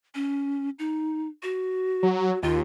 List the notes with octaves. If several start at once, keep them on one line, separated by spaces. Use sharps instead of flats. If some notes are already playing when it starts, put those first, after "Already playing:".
C#4
D#4
F#4
F#3
D#2 F4